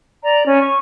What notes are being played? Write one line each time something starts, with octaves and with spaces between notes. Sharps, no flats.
D5 A#5
C#4
C#6